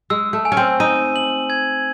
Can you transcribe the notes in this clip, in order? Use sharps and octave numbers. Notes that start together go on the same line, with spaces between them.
G#3 E6
A3
G#5
C#4
C4
D#4 D#7
F#7
G#6